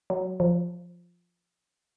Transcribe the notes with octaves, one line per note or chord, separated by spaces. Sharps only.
F#3
F3